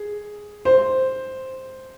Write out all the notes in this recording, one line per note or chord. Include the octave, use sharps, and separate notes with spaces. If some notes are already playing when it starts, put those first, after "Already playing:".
Already playing: G#4
C5